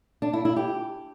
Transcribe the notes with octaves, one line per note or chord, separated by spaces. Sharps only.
D4
E4
E4
G4